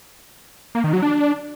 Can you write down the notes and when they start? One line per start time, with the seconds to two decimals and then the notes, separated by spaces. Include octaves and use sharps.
0.75 A#3
0.84 D#3
0.93 F#3
1.02 D4